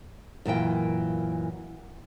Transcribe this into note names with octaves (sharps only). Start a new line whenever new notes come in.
F#2 A#2 E3 G5